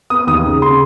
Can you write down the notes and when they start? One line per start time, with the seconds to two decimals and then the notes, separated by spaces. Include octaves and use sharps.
0.10 B3 D#6
0.27 D#2 D#6
0.45 C#3
0.62 C#3 C6